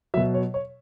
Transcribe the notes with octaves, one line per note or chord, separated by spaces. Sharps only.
B2 F#3 E5
C#5
C#5